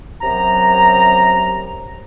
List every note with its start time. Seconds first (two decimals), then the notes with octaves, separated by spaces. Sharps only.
0.21 F#2 C3 F#3 A#5